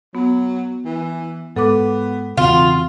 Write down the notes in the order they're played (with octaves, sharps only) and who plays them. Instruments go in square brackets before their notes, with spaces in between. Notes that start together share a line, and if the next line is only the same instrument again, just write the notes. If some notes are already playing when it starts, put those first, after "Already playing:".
[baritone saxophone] F#3 [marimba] B3
[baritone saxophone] E3
[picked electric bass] G#2 [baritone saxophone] B3 [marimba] A4 D6
[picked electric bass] E2 C#3 [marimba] C4 [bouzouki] F4 [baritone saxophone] F#4